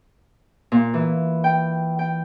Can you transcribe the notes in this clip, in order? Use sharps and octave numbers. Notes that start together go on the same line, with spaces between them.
A#2
E3
G5
G5